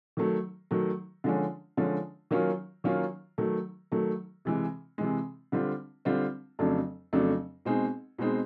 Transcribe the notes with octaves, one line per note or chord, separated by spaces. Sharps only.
D#3 F#3 A3
D#3 F#3 A3
D3 F3 G#3 C#4
D3 F3 G#3 C#4
D#3 F#3 A#3 C#4 F4
D#3 F#3 A#3 C#4 F4
D#3 F#3 A3
D#3 F#3 A3
C3 E3 G#3
C3 E3 G#3
D3 G3 C4 F4
D3 G3 C4 F4
F2 C#3 F#3 A3 D4
F2 C#3 F#3 A3 D4
B2 G#3 C4 D#4 G#4
B2 G#3 C4 D#4 G#4